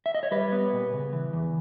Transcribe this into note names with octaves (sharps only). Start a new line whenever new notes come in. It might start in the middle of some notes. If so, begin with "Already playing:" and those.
E5
D#5
C#5
G3 B4
B3
A#2
C#3
E3
E2